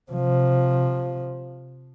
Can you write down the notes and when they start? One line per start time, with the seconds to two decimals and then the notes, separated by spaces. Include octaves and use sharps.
0.11 C3 F3